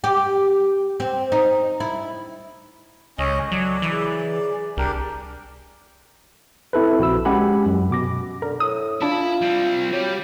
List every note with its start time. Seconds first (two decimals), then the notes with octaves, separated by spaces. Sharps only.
0.04 G4
1.00 C4
1.32 D#4
1.80 E4
3.18 C#2 C#4 A4 D#5
3.52 F#3 D5
3.82 C#3 E3 G#4 A#4
4.77 C2 D4 G4 A#4
6.73 C4 E4 A4 B4
6.99 A#1 F#4 B5 E6
7.25 G#3 C#4 G4 F#5 G#5 B5
7.66 F#2
7.91 B2 D6 A#6
8.42 D3 A#4
8.60 A2 D#6
9.02 D4 E4 F4 A5
9.42 G3 C4
9.93 F#3 G3 G4